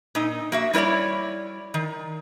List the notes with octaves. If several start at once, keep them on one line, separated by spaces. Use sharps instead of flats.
A#2 D#4
A#3 F#4 E5
G3 E4 B4 C#5 D5
D#3